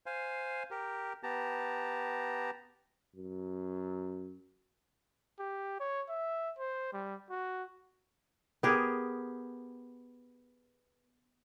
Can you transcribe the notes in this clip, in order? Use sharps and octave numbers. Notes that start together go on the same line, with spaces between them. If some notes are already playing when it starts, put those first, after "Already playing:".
C5 F5 G#5
G4 A#4
B3 G4 A5 A#5
F#2
G4
C#5
E5
C5
G3
F#4
B3 G4 G#4 A#4